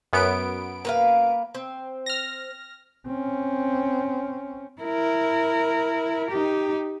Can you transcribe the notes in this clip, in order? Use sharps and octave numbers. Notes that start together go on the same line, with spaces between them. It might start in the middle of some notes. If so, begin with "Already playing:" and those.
F#2 B3 D7
A#3 B4 F5
C4
F6 A#6
C4 C#4
E4 A#4
D#4 G4